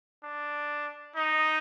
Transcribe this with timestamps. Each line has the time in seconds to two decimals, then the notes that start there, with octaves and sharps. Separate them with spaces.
0.24 D4
1.16 D#4